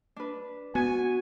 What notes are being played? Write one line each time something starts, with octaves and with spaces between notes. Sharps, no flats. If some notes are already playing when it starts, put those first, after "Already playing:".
D4 B4
B3 F#4 G#5